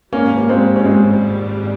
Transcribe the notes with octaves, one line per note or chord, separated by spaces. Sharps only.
G#1 G#2 G3 A#3 C#4
A#3
G#3 C4
C#4
G#3 C4